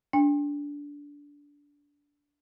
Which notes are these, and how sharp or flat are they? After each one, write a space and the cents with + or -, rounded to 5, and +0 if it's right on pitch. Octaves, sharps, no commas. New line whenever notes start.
D4 -20 G5 +40